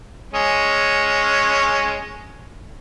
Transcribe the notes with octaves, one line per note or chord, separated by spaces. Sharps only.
G#3 C#4